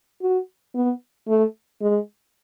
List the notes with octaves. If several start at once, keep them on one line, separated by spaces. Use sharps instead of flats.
F#4
B3
A3
G#3